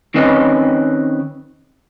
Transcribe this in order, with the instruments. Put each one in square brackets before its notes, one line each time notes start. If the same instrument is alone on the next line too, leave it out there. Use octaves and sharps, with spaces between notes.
[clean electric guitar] D#3 C4 C#4 B4 D#5